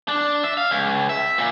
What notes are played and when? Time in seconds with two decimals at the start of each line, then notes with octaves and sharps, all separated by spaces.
0.09 D4
0.44 E5
0.57 F5
0.71 C#2
1.09 E5
1.38 A#2